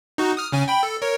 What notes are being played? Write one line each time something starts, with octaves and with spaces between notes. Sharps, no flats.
D#4 F#4
D#6 F6
C#3 C#4 G#5
G5 B5
A4
A#4 C#5